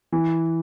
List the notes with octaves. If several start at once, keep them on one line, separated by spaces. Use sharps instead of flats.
E3